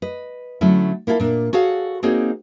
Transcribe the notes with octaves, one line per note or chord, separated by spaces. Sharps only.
B4 D#5
D3 F#3 A3 C#4 E4
A#3 E4 F4 G#4 A4
A#2 D4
F#4 G#4 A4 C#5 F5 F#5
A#3 C4 D#4 F#4 G#4 C#5